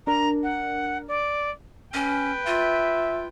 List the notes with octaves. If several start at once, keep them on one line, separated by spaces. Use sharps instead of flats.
D4 A#4 A#5
F#5
D5
C#4 B4 G5
F4 E5